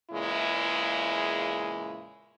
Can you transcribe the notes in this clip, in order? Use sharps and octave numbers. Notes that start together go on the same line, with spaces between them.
E2 A#2 C#3 G#3 E4